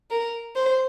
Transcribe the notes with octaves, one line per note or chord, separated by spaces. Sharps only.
A#4
C5